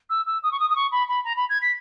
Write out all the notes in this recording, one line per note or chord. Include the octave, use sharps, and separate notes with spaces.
E6
E6
D#6
C#6
D#6
D#6
C#6
B5
B5
A#5
B5
G#6
B6